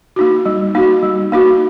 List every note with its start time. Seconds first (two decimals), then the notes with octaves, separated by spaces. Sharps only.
0.16 A#3 D#4 F#4
0.46 G3
0.75 A#3 D#4 F#4
1.03 G3
1.32 A#3 D#4 F#4